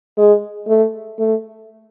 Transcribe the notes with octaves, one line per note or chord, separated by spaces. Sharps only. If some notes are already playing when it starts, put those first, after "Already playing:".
G#3
A3
A3